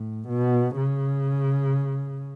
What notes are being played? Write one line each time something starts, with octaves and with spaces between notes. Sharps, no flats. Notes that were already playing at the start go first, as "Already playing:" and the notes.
Already playing: A2
B2
C#3